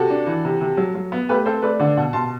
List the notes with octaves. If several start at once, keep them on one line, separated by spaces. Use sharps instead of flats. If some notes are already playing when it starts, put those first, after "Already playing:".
Already playing: C3 F#4 A4
D4
E3
C3
C3
F#3
F#3
B3
A3 G4 B4
C4 A4 C5
A3 B4 D5
D3 D5 F#5
B2 F#5 A5
B2 A5 C6